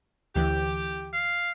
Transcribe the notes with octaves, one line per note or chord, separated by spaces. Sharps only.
D2 E3 G4
F5